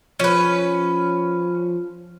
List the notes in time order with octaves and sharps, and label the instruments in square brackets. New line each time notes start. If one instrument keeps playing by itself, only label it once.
[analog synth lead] F3 [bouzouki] C#4 B4